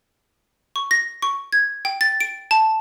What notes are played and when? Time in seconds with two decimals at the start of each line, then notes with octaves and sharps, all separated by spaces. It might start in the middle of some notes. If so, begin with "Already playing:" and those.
0.76 C#6
0.91 A#6
1.22 C#6
1.52 G#6
1.85 G5
2.01 A6
2.21 D7
2.51 A5